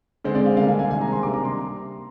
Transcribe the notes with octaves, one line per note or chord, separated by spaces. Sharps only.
D3 G#3 C4 C5
D5
F5
D3 G3 A#3 D4 F5
G#5
G#5
C3 D#3 G#3 C4 G#5
A#5
C6
C3 G3 A#3 D4 D6
A#5
C6